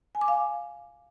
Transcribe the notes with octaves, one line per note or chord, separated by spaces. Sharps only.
G#5
D6
F5